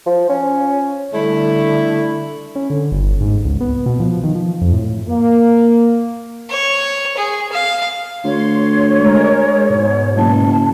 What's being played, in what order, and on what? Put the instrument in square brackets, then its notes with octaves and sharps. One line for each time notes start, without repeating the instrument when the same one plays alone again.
[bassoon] F3
C#4
[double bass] D3 [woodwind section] G3 E4 [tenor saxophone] A3
[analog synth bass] C#4
D3
G1
G#2
C#2
B3
B2
F3
D#3
F3
F2
A2
[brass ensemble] A#3
[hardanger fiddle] C#5
G#4
F5
[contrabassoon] D2 [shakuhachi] C#5 [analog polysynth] C6
[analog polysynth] G#3 A#4
G#2 B2
[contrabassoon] F#1 [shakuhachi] A5